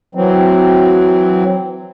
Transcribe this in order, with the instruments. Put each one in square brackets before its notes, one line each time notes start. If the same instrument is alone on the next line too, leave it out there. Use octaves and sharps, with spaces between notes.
[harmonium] E3 F#3 C4